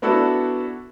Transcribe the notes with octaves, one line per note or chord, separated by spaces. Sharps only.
B3 D4 E4 F#4 A4